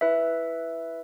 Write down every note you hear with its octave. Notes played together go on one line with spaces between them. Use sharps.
E4 B4 E5